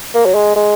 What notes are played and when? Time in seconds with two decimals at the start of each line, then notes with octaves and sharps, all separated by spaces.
0.14 A#3
0.26 F#3
0.35 G#3
0.56 G#3